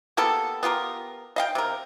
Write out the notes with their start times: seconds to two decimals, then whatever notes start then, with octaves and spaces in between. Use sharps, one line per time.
0.17 A#3 B3 G4 A4
0.63 B3 F4 G4 A#4
1.36 D#5 F5 G5
1.55 C3 A#4